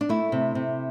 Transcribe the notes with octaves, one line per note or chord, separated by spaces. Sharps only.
D4
A3 E4
C3
C3